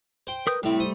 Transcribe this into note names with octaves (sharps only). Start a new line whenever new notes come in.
C5 G5
A#4 B4 D#6 G6
A2 G3 A3 C4 E4
C5 D#6